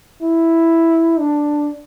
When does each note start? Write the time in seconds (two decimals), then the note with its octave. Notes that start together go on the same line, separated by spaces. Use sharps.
0.22 E4
1.19 D4